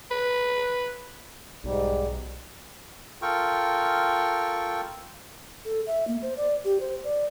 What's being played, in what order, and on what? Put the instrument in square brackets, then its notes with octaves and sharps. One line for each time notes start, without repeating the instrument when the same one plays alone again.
[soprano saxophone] B4
[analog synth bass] B1 [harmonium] G#2 G3
[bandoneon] F4 A4 A#4 G5 C#6
[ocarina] A4
E5
A#3
C5
D5
G4
C5
D5